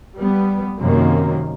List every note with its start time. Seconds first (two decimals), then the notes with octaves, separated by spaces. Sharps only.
0.17 G3 B3
0.79 F#2 C3 D#3 A#3